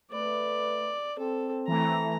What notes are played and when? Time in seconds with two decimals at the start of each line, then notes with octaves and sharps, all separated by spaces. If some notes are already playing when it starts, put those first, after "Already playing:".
0.12 A3 B4 D5
1.19 C4 A4
1.68 E3 A3 A#5